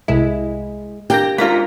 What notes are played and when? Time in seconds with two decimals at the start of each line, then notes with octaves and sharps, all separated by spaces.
0.08 C2 G#3 E4
1.10 A#3 D4 G4 G5 G6 A#6
1.38 G#2 A#3 C#4 D4 F4 A#5 A#6 B6